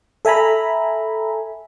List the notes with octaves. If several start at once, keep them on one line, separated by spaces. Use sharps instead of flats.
A4 E5 G#5 A#5 B5